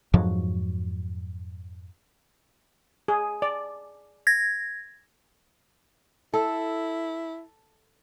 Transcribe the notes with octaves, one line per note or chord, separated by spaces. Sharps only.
F2 G#2 F3 F#3
G#4
D5
G#6 A#6
E4 A4